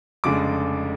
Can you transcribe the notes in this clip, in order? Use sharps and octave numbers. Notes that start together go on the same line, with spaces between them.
F1 F2 C#3 G#3 D4 D6